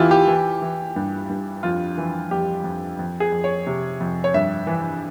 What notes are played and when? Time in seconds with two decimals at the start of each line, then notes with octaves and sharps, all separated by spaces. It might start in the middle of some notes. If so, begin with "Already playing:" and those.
Already playing: E2 E3 E4 F4 G4
0.11 G4
0.28 E3
0.62 E3
0.96 G2
1.29 G2
1.63 F2 F4
1.98 E3
2.31 F2 G4
2.64 F2
2.99 F2
3.20 G#4
3.32 F2
3.44 C#5
3.67 C3
4.00 F2
4.24 C#5
4.34 G2 E5
4.67 E3